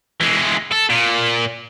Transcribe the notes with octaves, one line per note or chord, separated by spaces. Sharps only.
E3 G#3
A4
A#2